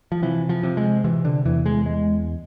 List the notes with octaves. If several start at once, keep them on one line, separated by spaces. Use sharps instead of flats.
F3
C3 E3
F3
C3
G#3
C3 E3
D3
E2 E3
G#3
G#3